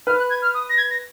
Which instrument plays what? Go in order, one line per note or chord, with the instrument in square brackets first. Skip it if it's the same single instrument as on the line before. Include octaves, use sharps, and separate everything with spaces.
[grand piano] B4 [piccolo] F6
[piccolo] F#6
G#6
F6
D#6
A#6
G#6
A#6